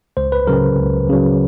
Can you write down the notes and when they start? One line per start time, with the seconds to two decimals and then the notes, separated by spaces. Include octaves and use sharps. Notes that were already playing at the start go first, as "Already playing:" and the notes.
0.17 C#2 C5
0.32 B4
0.47 C#3 F#3 A#4
0.78 C#2
1.09 C#3 F#3